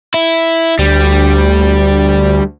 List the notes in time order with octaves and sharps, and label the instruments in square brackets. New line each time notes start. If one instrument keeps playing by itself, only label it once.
[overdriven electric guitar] E4
[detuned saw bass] D2 [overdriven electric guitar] G3